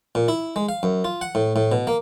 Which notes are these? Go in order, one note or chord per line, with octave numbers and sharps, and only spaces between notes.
A#2
E4
G#3
F5
F#2
F4
F#5
A2
A2
B2
A#3